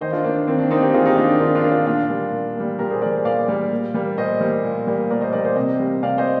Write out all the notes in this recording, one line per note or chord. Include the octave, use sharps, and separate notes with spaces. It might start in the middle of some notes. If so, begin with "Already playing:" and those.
D#3 C5 D#5
D4 F4
A#3 D4
D4
D#3 C4
D4
A#3 C4 D#4
D#4 G4
D#3 F4 G#4
D#4 G4
A#3 D4 F4
D4
D#3 D4 F4
D4 F4
A#3
D4 F4
A#2 D4 F4
G3 A#3
A#2
G3 A#3
A#2 G4 A#4
G#4 C5
G3 A#3 A#4 D5
A#2 D5 F5
G3 A#3
A#2
G3 A#3
A#2 C5 D#5
G3 A#3
A#2
G3 A#3
A#2 A#4 D5
C5 D#5
G3 A#3 A#4 D5
C5 D#5
C3 C5 D#5
G3 A#3
C3 D5 F5
C5 D#5